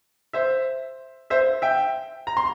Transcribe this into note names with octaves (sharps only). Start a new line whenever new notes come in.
C5 E5
C5 E5
E5 G5
A#5
C6